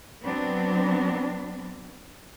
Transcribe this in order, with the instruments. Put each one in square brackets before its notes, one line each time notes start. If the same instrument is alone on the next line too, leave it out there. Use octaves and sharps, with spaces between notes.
[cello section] F#3 B3 C4 D4